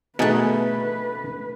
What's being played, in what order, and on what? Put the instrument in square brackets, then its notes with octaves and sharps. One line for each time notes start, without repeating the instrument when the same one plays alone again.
[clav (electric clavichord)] B2 D#4 G#4 [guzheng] A3 F#5 [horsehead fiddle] B4